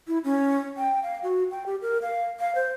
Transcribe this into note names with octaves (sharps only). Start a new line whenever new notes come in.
E4
C#4
G5
F5
F#4
G5
G4
A#4
F5
F5
C5